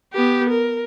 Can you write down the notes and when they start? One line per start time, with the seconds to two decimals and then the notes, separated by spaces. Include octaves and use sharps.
0.13 B3 G4
0.49 A#4